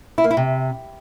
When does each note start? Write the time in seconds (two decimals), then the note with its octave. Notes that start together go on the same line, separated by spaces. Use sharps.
0.18 E4
0.24 A#3
0.31 E4
0.37 C3